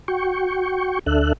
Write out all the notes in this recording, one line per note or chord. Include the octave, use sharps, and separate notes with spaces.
F#4 G5 C#6
D2 D4 A4 E5 F#6